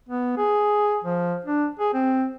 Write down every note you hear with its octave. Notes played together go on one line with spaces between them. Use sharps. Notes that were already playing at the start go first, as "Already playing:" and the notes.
B3
G#4
F3
D4
G#4
C4